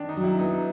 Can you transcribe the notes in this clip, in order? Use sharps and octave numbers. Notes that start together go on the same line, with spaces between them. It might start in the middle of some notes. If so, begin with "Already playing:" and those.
Already playing: D#3 D4
D#4
F#3
E4
B3 D#4